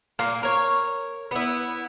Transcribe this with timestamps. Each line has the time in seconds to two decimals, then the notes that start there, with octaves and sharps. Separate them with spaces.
0.19 A#2 A#3
0.43 A#4 C#5
1.31 B3 E4